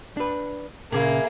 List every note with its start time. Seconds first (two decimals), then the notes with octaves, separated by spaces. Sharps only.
0.17 D4 B4
0.92 A#2 C#3 A#3 E4 G4 G#4